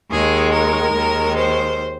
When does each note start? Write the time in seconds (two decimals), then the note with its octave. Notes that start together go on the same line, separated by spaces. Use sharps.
0.10 D#2 D#3 G#3 G#4
0.52 A#4
0.94 D#2 D#3 G#3
1.36 C5